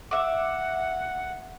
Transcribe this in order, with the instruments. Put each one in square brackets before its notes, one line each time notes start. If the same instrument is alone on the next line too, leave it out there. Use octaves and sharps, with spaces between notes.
[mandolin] E5 D6 [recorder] F#5